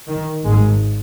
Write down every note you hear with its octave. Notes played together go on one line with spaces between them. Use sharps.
D#3
G#1 G#2 G#3